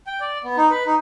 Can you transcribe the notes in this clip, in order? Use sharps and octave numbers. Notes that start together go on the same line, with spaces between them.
G5
D5
B3
D#4
B4
D#4